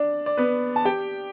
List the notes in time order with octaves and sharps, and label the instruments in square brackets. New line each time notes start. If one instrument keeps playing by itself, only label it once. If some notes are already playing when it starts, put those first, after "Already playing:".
Already playing: [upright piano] D4 D5
D5
B3 B4
A5
G4 G5